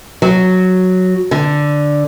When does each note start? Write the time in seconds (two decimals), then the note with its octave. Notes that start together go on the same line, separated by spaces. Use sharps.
0.22 F#3
1.31 D3